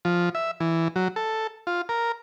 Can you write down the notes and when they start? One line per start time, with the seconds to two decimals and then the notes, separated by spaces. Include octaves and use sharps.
0.05 F3
0.35 E5
0.60 E3
0.96 F#3
1.16 A4
1.67 F4
1.89 A#4